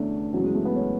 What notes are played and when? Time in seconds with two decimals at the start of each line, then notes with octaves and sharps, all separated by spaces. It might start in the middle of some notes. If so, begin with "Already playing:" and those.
Already playing: E2 D3 A3 C#4 D4
0.33 F#2 C#3 E3 F#3
0.44 G#3
0.55 A3
0.65 B3
0.75 C#4